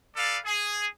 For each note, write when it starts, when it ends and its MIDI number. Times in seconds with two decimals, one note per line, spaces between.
0.16 0.37 69
0.16 0.37 71
0.16 0.37 74
0.16 0.37 77
0.45 0.87 68